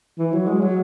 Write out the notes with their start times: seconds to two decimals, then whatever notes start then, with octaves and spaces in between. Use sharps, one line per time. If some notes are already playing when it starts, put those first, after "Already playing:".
0.18 E3
0.32 F#3
0.47 G#3
0.61 F#3